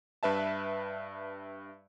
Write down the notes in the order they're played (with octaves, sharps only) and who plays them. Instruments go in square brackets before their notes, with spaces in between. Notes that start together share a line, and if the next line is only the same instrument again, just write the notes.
[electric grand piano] G2 B4 E5 A5